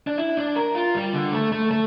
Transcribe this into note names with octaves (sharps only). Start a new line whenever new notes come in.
D4
E4
D4
A#4
F4
G3
D3
A3
A3
A3